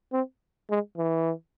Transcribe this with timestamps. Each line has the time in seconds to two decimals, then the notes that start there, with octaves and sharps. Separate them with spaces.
0.13 C4
0.70 G#3
0.97 E3